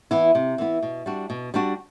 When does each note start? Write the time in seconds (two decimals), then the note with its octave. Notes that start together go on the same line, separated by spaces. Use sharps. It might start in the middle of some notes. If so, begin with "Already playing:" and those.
0.11 E3 B3 E4
0.35 C3
0.58 E3 B3 E4
0.83 B2
1.06 G3 D4 F#4
1.30 B2
1.54 G3 D4 F#4